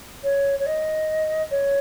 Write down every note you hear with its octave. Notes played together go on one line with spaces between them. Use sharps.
C#5
C#5
D#5
C#5